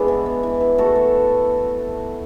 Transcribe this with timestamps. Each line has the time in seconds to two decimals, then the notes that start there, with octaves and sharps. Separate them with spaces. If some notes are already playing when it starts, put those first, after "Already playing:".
Already playing: G#3 B3 D4 E4 F#4 G#4 B4
0.08 E3
0.26 B3
0.43 E3
0.61 E3
0.78 A3 F#4 A4
0.95 A3